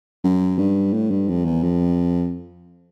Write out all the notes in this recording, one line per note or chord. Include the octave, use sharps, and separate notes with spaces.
F#2
G2
A2
G2
F2
E2
F2